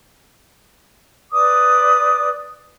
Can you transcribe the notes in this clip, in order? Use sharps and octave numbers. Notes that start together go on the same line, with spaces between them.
B4 D5 D6 D#6